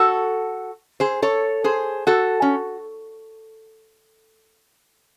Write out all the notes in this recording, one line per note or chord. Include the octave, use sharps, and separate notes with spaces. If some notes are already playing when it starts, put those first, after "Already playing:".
Already playing: F#4 A4
G#4 C5
A4 C#5
G#4 C5
F#4 A4
C#4